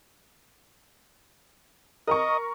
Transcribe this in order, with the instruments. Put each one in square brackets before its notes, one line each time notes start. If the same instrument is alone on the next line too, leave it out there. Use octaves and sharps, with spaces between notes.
[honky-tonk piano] A#4 A#5 C#6 [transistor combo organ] D#5